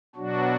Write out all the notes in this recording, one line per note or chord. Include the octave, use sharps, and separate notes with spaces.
B2 F#3 D4 F#4